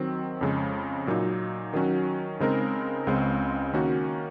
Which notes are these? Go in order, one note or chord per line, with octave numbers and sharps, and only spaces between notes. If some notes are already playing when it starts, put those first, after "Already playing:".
Already playing: D#3 F#3 C4
F2 C#3 G#3
A#2 F#3 A#3 D#4
D#3 F#3 C#4 F#4
C#3 G#3 C4 D#4 A#4
C#2 C#3 G#3 C4
D#3 A#3 C#4 F#4